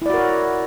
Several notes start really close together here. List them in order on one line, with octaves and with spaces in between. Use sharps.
E4 D5 F#4 A#4 C#5